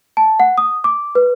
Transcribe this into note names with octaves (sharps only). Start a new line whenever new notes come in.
A5
F#5
D#6
D6
B4